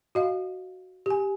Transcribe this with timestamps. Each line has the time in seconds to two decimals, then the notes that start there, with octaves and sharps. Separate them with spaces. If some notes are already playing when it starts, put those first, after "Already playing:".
0.15 F#4 D#5 F5
1.06 G4 G#5